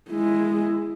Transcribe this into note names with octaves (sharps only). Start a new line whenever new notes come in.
G#3 E4